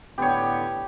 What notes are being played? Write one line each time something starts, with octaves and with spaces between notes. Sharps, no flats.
A2 D3 B3 G4 C#5